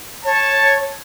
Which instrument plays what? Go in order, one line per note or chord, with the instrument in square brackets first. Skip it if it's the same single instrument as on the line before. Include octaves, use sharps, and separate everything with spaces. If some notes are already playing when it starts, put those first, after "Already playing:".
[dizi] C#5 [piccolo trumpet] A5